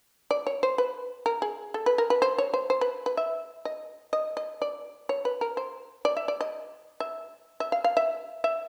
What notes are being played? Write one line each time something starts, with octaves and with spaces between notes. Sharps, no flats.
D5
C#5
C5
B4
A#4
G#4
A4
B4
A#4
B4
C5
C#5
C5
C5
B4
B4
E5
D#5
D#5
D#5
D5
C#5
B4
A#4
C5
D5
E5
D5
D#5
E5
E5
F5
F5
E5
E5